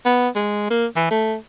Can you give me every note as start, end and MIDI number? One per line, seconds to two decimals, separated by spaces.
0.05 0.28 59
0.36 0.70 56
0.71 0.86 58
0.96 1.07 52
1.11 1.35 57